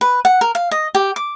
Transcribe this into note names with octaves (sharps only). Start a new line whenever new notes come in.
B4
F#5
A#4
F5
D#5
G4
D6